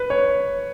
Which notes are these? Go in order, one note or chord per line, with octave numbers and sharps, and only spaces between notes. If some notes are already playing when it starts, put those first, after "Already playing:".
Already playing: B4
C#5